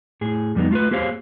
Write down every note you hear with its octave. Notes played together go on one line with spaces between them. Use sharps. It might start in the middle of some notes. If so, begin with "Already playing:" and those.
A2 G#4
F2 G3 B3 D#4
A3 F4 A4 B4
A#3 G4 G#4 C5 C#5 F5